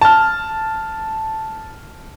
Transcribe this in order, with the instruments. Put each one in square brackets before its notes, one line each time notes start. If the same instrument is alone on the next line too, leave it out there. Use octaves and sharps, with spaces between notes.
[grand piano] A5 F6